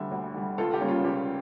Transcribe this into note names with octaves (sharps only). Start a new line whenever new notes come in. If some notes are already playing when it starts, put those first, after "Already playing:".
Already playing: D2 D3 G3 E5
D2
D3 G3
C#2 F4 A4
G4
C#3 G3 A#3 C#4
F4
C#2 G4